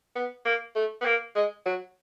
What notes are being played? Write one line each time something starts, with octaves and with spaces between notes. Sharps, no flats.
B3
A#3
A3
B3
A#3
G#3
F#3